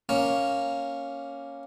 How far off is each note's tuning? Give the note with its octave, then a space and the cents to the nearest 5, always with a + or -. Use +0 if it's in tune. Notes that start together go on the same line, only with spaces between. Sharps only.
A#3 +0 C#4 +0